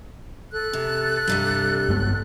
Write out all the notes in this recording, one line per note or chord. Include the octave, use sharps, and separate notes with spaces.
A4 F#6
C3
G2 C3 G3
G2 G#3 B3